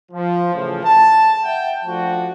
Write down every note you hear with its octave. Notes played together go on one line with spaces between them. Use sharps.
F3
A2 C#3 E3 F3
A5
E5 F#5 G5
F3 A3 D4 F#4